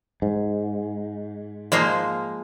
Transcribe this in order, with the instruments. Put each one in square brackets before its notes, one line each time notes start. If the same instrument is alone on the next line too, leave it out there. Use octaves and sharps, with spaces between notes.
[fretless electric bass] G#2
[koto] F3 G#3 A#3